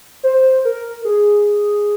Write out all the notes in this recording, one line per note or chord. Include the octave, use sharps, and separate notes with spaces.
C5
A#4
G#4